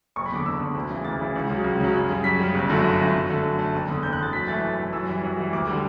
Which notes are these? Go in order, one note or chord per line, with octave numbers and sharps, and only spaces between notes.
F#1 C#6
B5
E2 D3 D6
F#1 E6
E2 D3
D2
C#3 E3
D2 A6
C#3 E3
C#2
C#3 F#3
C#2
C#3 F#3
F#2
C#3 G3
F#2 B6
C#3 G3
G1
F#2 D3 A3
G1
F#2 D3 A3
F#2
D3 A3
F#2
D3 A3
F#1
E2 D3
F#1 G6
F#6
E2 D3 A6
F#2 B6
E3 A3 A6
F#2
E3 A3
F#2 E6
E3 G3
F#2
E3 G3
D2 D6
D3 G3